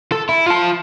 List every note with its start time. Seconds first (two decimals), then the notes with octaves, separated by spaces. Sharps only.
0.12 A4
0.29 E4
0.46 F4 A5